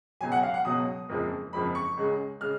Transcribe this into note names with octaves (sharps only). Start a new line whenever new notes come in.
C#2 B2 F#3 G#5
F#5
F5
F#5
C#2 B2 F#3 D#6
F#1 F2 F3 G#3
F#1 F2 F3 G#3 B5
C#6
C#2 C#3 G#3
C#3 G#3 F6